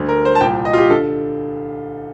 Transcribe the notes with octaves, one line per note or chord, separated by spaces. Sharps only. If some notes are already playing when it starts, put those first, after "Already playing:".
Already playing: D2 D3
A#4
C5
A5
C2 A#2 G5
D#5
F4
G4
D3 A4